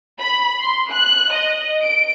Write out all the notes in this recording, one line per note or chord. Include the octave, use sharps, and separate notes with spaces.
B5
C6
F#6
D#5
D7